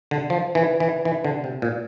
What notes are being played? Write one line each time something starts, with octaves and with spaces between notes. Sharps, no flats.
D3
F3
E3
E3
E3
D3
C3
A#2